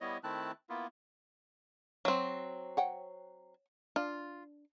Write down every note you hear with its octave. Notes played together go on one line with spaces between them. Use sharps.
G3 B3 E4 C#5 D#5
D#3 A3 C4 E4 A5 F#6
A#3 B3 E4 F4
F#3 C4
C#5 F#5 G5
D4 F4